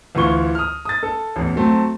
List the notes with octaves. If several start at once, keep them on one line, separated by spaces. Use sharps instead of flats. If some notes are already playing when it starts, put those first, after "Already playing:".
D2 E3 F4 C#6 G7
D#6 F6
D#6 A6
A4
A1 E2
F#3 A3 C4